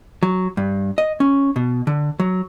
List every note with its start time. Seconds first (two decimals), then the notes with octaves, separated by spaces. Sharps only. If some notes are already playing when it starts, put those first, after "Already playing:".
0.23 F#3
0.57 G2
0.98 D#5
1.20 C#4
1.56 B2
1.87 D3
2.20 F#3